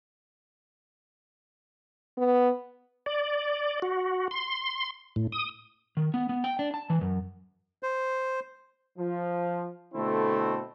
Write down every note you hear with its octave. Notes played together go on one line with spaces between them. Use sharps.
B3
D5
F#4
C6
A2
D#6
D#3
B3
B3
G5
D4
A5
E3
F#2
C5
F3
B2 D3 A3 C4 E4 A4